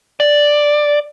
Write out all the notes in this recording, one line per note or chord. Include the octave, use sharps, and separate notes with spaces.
D5